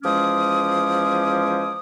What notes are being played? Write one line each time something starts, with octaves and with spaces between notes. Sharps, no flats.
E2 F3 G#3 C#4 D6 D#6